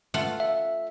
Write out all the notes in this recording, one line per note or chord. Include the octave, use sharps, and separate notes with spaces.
A3 F4 F#5
E5